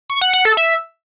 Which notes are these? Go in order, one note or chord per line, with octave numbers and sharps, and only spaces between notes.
C#6
F#5
F#5
A4
E5